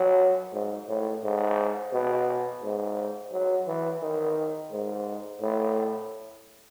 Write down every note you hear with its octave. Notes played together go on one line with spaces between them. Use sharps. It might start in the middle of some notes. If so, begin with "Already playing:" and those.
Already playing: F#3
G#2
A2
G#2
B2
G#2
F#3
E3
D#3
G#2
A2